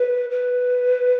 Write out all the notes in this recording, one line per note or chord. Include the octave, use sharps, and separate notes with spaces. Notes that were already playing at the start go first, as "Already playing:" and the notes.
Already playing: B4
B4